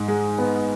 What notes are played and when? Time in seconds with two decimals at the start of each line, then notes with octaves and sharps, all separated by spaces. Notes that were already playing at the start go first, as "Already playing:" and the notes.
Already playing: G#2
0.08 G#3
0.38 B3